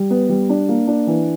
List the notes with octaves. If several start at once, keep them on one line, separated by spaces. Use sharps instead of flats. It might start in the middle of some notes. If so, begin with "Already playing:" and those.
Already playing: G3
B3
G3
D4
A#3
D4
E3